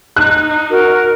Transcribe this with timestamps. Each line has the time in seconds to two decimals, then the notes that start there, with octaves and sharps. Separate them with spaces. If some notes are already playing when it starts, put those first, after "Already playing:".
0.16 D#4 F#6
0.70 F#4 A#4